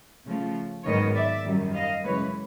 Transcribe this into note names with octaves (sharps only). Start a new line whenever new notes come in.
C#3 F3 A3
G#2 D#3 F#3 B3 C#5 D#5
D5 E5
F#2 D#3 G3
D#5 F5
F#2 C#3 E3 G#3 B4 C#5